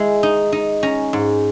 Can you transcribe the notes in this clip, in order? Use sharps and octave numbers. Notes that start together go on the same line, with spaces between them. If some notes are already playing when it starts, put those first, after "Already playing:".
Already playing: G#3 E4
D#4
D#4
C#4 A#5
G#2